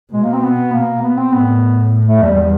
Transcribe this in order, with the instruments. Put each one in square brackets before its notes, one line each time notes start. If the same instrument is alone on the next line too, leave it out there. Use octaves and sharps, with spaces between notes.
[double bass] B2 [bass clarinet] G#3
[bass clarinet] A#3
C4
B3
A#3
B3
C4
[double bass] A2 [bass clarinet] B3
[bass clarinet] A3
[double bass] E2 [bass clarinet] G3
[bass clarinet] G3